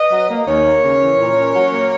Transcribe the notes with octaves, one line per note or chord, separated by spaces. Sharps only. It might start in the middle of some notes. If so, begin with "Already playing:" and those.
Already playing: B4 D#5
F#3
A#3
D#2 A#4 C#5
A#3
C#3
E3
A#2
C#4
F#3
A#3